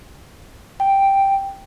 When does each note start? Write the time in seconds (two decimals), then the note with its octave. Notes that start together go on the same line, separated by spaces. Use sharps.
0.80 G5